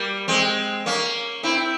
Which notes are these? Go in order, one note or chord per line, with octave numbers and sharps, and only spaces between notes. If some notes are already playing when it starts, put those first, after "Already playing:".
Already playing: G3 A#3
G#3 C4
A#3 C#4
C4 E4